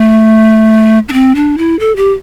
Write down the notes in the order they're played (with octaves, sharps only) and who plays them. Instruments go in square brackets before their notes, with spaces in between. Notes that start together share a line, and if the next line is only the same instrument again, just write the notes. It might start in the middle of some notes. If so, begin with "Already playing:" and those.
Already playing: [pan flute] A3
D4
C4
D4
E4
A4
G4